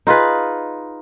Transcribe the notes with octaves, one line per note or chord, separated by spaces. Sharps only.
D#4 F4 G#4 B4